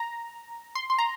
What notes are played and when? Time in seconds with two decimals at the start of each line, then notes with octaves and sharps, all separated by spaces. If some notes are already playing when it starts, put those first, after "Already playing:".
Already playing: A#5
0.75 C6
0.90 C6
0.98 A#5